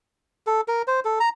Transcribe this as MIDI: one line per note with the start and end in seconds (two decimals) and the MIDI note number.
0.47 0.61 69
0.68 0.82 70
0.87 1.00 72
1.05 1.19 69
1.20 1.29 82